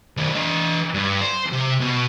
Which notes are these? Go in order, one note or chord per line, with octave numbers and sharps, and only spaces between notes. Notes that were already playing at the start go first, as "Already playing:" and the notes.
D#3 A3
E3 D#5
G2
C5
C3
B2